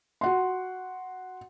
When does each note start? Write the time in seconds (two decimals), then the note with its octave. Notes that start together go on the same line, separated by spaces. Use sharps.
0.21 F#4 F#5 C6